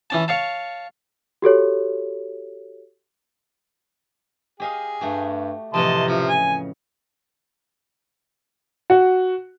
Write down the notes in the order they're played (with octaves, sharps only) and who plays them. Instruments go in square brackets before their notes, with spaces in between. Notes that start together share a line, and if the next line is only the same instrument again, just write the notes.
[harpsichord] E3 C#4 A5
C#5 F5 A5
[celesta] F#4 G4 A4 C#5
[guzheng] G4 D#5 F5 [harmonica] G#4
[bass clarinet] G2 [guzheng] A3 F#4 G4
[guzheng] F2 A2 E3 [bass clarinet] C3 [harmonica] D#5 A5 C6
[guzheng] C#3 D#5 [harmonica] F3
[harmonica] G#5
[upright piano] F#4